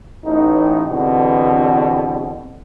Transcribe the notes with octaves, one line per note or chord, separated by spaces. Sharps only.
A1 D#4
E2 G2 B2 D3 C4